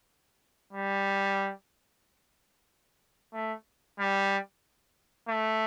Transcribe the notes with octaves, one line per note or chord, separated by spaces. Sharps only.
G3
A3
G3
A3